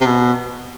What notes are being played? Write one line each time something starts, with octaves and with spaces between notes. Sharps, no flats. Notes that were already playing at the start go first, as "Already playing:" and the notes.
C3
B2